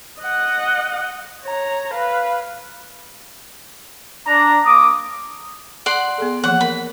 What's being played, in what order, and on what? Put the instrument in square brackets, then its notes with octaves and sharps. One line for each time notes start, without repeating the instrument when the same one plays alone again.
[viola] D#5 F#5
C#5 A#5
B4 F5
[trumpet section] D4 A#5
A#3 D6 D#6
[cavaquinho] D5 F#5 C6
[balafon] B3 G#4 A4
[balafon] E3 F3 A#3 [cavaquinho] F#5
[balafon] A#4 F#5 [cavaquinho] B5